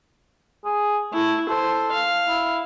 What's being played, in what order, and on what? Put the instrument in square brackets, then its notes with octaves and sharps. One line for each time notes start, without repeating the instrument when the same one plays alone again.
[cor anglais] G#4
[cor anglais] A3 [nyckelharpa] E4
[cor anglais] A4 [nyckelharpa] C5
[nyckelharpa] F5
[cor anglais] E4